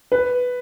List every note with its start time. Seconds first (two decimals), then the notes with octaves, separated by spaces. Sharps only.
0.12 B4